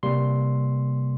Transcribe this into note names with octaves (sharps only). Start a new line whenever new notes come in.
C3 G3 A#3 C6